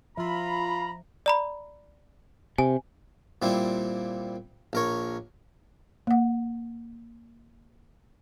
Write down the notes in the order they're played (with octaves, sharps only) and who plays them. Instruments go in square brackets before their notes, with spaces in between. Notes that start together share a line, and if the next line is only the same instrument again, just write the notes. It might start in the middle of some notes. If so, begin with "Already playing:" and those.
[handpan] F3 E5 [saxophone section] F4 [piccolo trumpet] A#5 [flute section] B5
[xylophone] D5 A#5 B5
[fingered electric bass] C3 [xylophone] G#5
[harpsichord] A#2 G3 C4 E4
A#1 A#4 C#5
[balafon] A#3 F#5